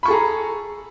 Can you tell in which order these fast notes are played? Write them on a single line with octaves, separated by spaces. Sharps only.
B5 C#6 A4 G#4 A#5